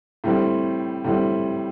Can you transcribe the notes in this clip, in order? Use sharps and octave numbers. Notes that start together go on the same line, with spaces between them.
A2 G3 C4
A2 G3 C4